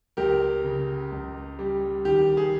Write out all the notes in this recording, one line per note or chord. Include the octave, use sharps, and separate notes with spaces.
C#2 G4 A#4
C#3
C#2
G3
D#3 G4
G#4